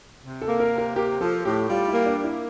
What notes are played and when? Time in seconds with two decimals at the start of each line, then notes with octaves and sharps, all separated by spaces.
0.23 C3
0.42 A4
0.48 A#3
0.60 A#4
0.72 C3
0.78 A#4
0.96 A#3 G4
1.21 F3 A4
1.45 A2 G4
1.69 G3 F4
1.88 E4
1.94 A#3
2.06 D4
2.18 A#3
2.24 E4